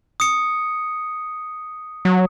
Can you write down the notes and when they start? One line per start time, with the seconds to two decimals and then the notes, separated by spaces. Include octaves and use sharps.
0.20 D#6 C#7
2.05 F#3